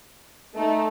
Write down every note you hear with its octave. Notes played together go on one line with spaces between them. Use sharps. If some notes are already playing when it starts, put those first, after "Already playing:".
A3 D#4 A4